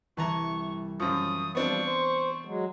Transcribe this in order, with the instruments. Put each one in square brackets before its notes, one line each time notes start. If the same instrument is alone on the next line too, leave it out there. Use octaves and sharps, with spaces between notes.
[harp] C2 E3 [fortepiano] B4 A5 A#5 [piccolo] C#6
[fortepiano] F#2 F3 [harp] C#5 [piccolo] D#6
[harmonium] F3 G3 [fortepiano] B3 C4 D4 [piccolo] C#6
[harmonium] C5
F#3 G#3